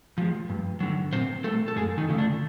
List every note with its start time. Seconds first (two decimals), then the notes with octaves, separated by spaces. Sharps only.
0.18 F3 G#3
0.50 G2
0.80 D3 F#3
1.12 A#2 C4 C5
1.44 G3 A3 A4
1.68 A4
1.76 F#2 G#3 G#4
1.98 D#3 D#4
2.09 C#3 F3 A3
2.18 D3 D4